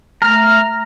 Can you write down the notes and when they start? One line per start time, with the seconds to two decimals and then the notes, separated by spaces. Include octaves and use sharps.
0.22 A3 A#5 F6